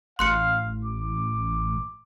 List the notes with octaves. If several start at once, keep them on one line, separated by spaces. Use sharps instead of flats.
A1 F5 C6 F#6 C#7
D6